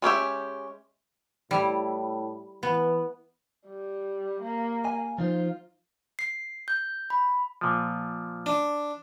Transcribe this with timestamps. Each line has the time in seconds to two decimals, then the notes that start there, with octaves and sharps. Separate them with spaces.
0.02 G#3 C#4 G4 E5
1.51 A2 G3 E4
2.63 E3 B3
3.67 G3
4.42 A#3
4.85 G#5
5.18 F3 D#4 F4 C5
6.19 C7
6.68 G6
7.10 B5
7.61 A#2 F3
8.46 D4